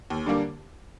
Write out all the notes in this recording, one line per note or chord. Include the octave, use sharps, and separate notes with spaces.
D#2
D3 G3 A#3 D4